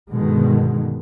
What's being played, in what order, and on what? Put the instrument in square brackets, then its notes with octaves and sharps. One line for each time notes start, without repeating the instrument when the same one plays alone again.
[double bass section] G2 B2 D3 D#3 G#3